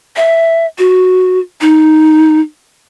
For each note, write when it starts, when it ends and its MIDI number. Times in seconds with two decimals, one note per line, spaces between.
0.16 0.66 76
0.78 1.39 66
1.61 2.40 63